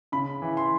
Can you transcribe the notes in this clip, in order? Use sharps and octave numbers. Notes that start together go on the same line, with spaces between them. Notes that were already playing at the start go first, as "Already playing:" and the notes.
C#3 B5
E3
C6